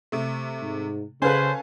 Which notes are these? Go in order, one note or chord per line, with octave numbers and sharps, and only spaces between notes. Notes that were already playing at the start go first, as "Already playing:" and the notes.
C3 A3
G#2
C#3 C#4 A4 B4 C5 F5 G#5